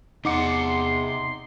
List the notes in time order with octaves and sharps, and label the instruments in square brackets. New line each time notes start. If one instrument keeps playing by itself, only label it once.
[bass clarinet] E2 [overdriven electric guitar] C3 F#5 [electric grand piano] D#4 D6 C#7 [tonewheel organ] C6